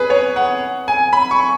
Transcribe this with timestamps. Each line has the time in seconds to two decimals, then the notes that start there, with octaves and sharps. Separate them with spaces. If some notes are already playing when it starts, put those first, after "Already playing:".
Already playing: G#4 B4
0.10 C#5
0.36 F#5
0.88 G#5
1.13 B5
1.31 C#6